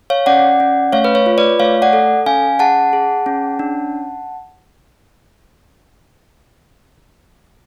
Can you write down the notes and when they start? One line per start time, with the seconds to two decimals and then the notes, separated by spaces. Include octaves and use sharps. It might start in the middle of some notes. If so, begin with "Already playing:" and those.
0.10 C#5 F5
0.26 C#4 D5 F#5
0.60 C#4
0.92 A3 C#5 F5
1.04 B4
1.15 C#5
1.26 F4
1.38 B4 D5
1.60 A3 C#5 F5
1.82 D5 F#5
1.93 A4
2.26 C#4 F5 G#5
2.59 G#4 F#5 A5
2.93 G#4
3.26 C#4
3.59 D4